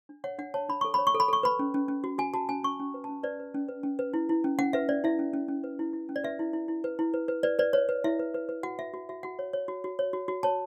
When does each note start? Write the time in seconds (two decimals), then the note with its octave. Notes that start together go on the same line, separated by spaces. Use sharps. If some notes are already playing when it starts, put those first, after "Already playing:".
0.09 D4
0.24 C#5 F#5
0.38 D4 F#5
0.54 C#5 A5
0.69 D4 B5
0.81 A4 C#6
0.94 C#5 B5
1.07 C#6
1.15 A4
1.20 B5
1.28 A4 C#6
1.43 B4 B5
1.59 C#4
1.74 C#4
1.88 C#4
2.04 F#4
2.18 F#4 G#5
2.34 F#4 A5
2.49 C#4 G#5
2.63 C#4 C#6
2.80 C#4
2.94 B4
3.04 C#4 A5
3.23 B4 D5
3.40 B4
3.54 C#4
3.69 B4
3.83 C#4
3.99 B4
4.14 E4
4.29 E4
4.44 C#4
4.59 C#4 F#5
4.73 B4 E5
4.88 C#4 D5
5.04 E4 E5
5.19 C#4
5.34 C#4
5.48 C#4
5.64 B4
5.79 E4
5.93 E4
6.09 C#4
6.16 D5
6.24 B4 E5
6.39 E4
6.53 E4
6.68 E4
6.84 B4
6.99 E4
7.14 B4
7.28 B4
7.43 B4 D5
7.59 B4 D5
7.73 B4 C#5
7.89 B4
8.04 E4 E5
8.19 B4
8.34 B4
8.49 B4
8.63 F#4 F#5
8.79 F#4 E5
8.94 F#4
9.09 F#4 E5
9.23 F#4 F#5
9.39 C#5
9.53 C#5
9.68 F#4
9.84 F#4
9.99 C#5
10.13 F#4
10.28 F#4
10.43 C#5 A5